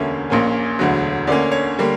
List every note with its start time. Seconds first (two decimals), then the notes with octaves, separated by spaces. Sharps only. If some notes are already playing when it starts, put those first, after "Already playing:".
Already playing: E1 D2 D3 A#3 C#4 E5
0.30 A#1 A#2 A#3 C#4
0.79 E1 D2 D3 F#3
1.27 D2 D3 A#3 C#4 D5
1.52 C#5
1.78 D3 G3 A#3